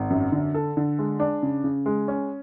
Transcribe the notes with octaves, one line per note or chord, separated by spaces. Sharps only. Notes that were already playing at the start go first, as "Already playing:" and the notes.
Already playing: G#1
F#2
D3
A4
D3
G#3
D4
C#3
C#3
G#3
C#4